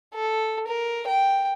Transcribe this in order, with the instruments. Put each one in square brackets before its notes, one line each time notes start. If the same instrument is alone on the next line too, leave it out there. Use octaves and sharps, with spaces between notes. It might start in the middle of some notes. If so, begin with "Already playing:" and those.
[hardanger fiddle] A4
A#4
G5